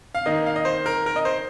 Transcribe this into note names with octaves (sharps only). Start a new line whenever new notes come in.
F5
D#3 A#3 D#5
F5
D#5
C5
A#4
A#4
D#5
C5